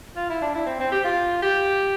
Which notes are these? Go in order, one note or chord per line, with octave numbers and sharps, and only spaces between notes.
F4
E4
D4
E4
C4
C4
G4
F4
G4